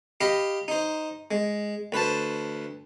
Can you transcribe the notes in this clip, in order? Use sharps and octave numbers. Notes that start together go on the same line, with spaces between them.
G4 D#5 F5 B5
D#4 C5
G#3
D2 B4 C5 A5